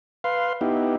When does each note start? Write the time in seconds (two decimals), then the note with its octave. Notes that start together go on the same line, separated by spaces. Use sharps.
0.24 B4 F5 C6
0.61 B3 D#4 E4 G4